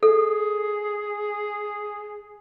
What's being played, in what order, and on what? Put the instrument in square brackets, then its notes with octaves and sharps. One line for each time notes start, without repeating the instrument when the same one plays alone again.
[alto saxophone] G#4 [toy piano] A4